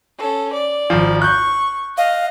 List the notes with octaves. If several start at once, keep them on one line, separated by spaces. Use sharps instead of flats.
C#4 A4
D5
G#1 F3
C#6 F#6 G6
D#5 F5